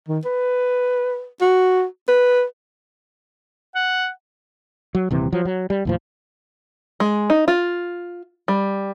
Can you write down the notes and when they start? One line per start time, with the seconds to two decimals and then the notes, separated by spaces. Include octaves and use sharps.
0.08 D#3
0.25 B4
1.41 F#4
2.08 B4
3.75 F#5
4.95 F#3
5.11 D#1 C3 E3
5.33 F3 F#3
5.45 F#3
5.70 G3
5.85 D#2 A2 F3
7.00 G#3
7.30 D#4
7.48 F4
8.48 G3